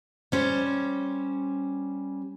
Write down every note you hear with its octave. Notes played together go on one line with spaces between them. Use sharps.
G3 C#4 C5